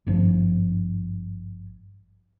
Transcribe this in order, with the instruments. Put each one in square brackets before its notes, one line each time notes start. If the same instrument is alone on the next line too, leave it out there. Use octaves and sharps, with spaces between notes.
[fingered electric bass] G#1 G2 F3